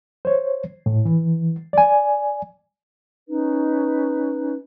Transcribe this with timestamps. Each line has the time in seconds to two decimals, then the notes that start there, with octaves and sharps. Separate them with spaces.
0.25 C5 C#5
0.86 A2
1.05 E3
1.73 D5 G#5
3.28 C#4 D#4 B4